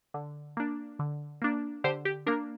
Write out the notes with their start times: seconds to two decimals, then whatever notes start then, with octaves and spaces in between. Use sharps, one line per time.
0.14 D3
0.57 A#3 D4
0.99 D3
1.42 A#3 D4
1.84 D3 G4 C5
2.05 G4
2.26 A#3 D4 A#4